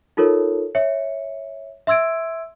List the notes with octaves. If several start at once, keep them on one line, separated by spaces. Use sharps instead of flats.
D#4 F4 A4 A#4 C#5
C#5 E5 C#7
E5 C6 E6 G#6 D7